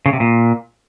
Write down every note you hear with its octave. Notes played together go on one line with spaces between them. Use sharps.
C#3
C3
A#2